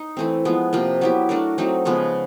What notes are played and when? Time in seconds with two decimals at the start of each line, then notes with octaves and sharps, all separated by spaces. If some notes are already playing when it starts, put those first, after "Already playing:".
Already playing: D#4
0.17 E3 A3 C4
0.45 F3 G#3 B3
0.73 C3 F3 A#3
1.01 F#3 B3 E4 G4
1.29 A3 D4 F#4 A#4
1.58 F#3 A3 C4 D#4
1.85 C#3 F3 G#3 B3